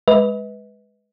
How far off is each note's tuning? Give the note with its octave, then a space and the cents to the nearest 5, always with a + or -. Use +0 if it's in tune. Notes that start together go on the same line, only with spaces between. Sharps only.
G#3 +0 B4 +0 D#5 +45